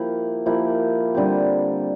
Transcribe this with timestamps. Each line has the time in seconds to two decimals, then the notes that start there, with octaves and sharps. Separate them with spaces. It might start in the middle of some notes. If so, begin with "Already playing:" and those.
Already playing: F3 A#3 E4 G4
0.46 F3 A#3 E4 G4
1.14 D3 G3 C4 G4